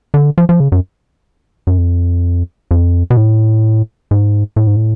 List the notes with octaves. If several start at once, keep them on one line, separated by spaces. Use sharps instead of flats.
D3
F3
F3
C#3
F#2
F#2
F2
F2
B2
A2
G#2
A2
G#2
A2